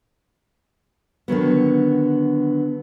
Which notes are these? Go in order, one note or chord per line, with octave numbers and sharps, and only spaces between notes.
D3 D#3 F#3 B3